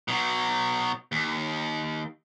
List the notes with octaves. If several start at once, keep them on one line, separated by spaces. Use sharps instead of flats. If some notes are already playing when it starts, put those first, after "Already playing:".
B2 F#3
D#2